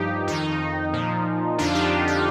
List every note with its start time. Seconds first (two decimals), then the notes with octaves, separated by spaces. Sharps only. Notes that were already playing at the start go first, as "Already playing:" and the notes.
Already playing: G2 F3 D#4 G4
0.27 F2 D#3 D#4
0.93 A#2 F3
1.58 F2 D3 F3 D4 F4
1.75 D#4 G4
2.08 D#4